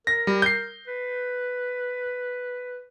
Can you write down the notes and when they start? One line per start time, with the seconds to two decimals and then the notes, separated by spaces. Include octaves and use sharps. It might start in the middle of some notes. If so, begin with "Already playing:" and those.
0.07 A#4 A#6
0.27 G3
0.42 G6 C7
0.87 B4